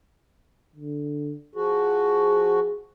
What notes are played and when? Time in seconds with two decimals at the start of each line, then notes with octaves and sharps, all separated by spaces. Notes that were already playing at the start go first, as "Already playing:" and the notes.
0.75 D3
1.55 F3 F#4 G#4